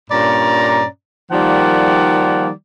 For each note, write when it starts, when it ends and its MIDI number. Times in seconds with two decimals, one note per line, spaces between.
0.10 0.86 43
0.10 0.86 46
0.10 0.86 61
0.10 0.86 74
0.10 0.86 82
1.31 2.50 51
1.31 2.50 53
1.31 2.50 55
1.31 2.50 58
1.31 2.50 74
1.31 2.50 78